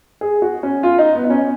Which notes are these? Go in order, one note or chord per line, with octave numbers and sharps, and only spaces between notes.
G#4
F#4
C#4
F4
D#4
B3
D#4
C#4